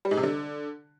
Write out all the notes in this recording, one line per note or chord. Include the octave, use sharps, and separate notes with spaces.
G3
G#2
C3
D3